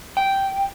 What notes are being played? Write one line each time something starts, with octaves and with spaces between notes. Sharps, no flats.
G5